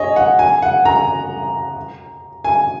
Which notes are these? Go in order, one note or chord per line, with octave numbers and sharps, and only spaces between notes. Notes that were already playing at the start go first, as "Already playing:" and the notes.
Already playing: C#5 D#5 G#5
F#5
G#5
F#5
A#5
G#5